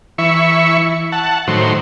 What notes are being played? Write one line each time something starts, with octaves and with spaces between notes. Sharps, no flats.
E3 E5 C#6
F#5 A5
A2 D#3 F#3 C5